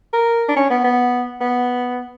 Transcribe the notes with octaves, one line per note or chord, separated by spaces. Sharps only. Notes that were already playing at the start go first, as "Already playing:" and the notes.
A#4
D4
C#4
B3
B3
B3